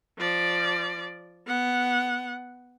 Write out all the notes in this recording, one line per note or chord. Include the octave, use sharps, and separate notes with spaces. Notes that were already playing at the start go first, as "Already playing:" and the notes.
F3 D5
B3 F#5